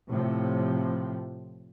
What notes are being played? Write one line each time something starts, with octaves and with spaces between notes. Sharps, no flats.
A2 C3 F3